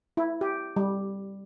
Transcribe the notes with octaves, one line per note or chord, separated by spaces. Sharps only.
E4
G4
G3